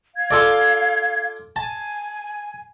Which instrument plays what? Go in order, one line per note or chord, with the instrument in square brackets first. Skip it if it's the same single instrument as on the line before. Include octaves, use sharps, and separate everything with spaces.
[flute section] F5 G#6
[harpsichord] F4 A4 D5
[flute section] G#5 [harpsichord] A5